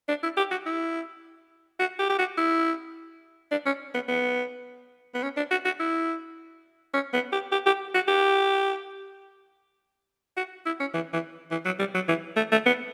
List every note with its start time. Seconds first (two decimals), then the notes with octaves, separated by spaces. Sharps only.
0.08 D4
0.23 E4
0.37 G4
0.51 F#4
0.66 E4
1.79 F#4
1.99 G4
2.09 G4
2.18 F#4
2.37 E4
3.51 D4
3.66 C#4
3.94 B3
4.08 B3
5.14 B3
5.23 C#4
5.37 D4
5.51 F#4
5.65 F#4
5.79 E4
6.94 C#4
7.13 B3
7.32 G4
7.52 G4
7.66 G4
7.95 F#4
8.08 G4
10.37 F#4
10.66 E4
10.80 C#4
10.94 E3
11.13 E3
11.51 E3
11.65 F#3
11.79 G3
11.94 F#3
12.08 E3
12.36 A3
12.52 A3
12.66 B3